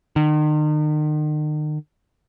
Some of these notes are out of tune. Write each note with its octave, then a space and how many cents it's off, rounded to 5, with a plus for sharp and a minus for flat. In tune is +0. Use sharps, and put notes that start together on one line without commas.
D#3 -40